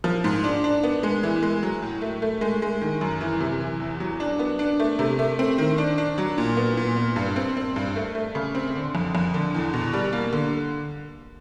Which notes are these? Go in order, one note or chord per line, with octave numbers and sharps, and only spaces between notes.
F3
G#2
D4
D4
B3
G#3
E3
G#3
F#3
A2
A3
A3
G#3
G#3
D#3
F#2
E3
C3
E3
E2
F#3
D4
B3
D4
A3
C3
A3
C4
D#3
D4
D4
F#3
A#2
B3
A#2
B3
G2
C4
C4
G2
A3
A3
C#3
C4
D3
F2
F2
D3
E2
B2
G3
A#3
D3